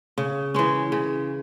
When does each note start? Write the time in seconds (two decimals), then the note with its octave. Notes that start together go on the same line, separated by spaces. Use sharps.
0.18 C#3
0.54 E3 G#3 C#4
0.92 C#3